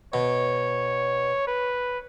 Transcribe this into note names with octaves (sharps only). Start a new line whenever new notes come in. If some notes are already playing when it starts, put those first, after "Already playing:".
B2 C#5
B4